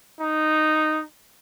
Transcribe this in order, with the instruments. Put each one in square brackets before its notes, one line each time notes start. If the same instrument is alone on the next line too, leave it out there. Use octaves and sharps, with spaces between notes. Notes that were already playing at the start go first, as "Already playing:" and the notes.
[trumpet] D#4